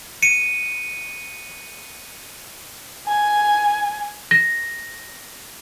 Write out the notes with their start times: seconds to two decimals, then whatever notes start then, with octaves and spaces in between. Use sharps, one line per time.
0.22 C#7 D#7
3.06 G#5
4.31 A#6